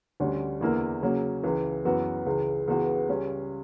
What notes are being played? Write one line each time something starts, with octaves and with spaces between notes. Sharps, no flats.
D2 D3 G3 C#4
E2 D3 A#3 E4 A#4
C#3 F#3 A#3 C#4
C#2 C#3 E3
F#2 E3 B3 F#4
C#2 C#3 E3
C#2 C#3 E3 B3 F#4
C#2 C#3 G3 C#4